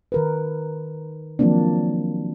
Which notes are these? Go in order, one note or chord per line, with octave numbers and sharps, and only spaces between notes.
D#3 A#4 B4
D#3 F3 F#3 A#3 C4 D4